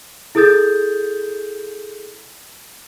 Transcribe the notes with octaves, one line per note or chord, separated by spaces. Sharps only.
E4 G#4 A4 D#6 G6 A6